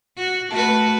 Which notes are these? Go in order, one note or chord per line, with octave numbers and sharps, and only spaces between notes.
F#4
A3 F#4 B4 A5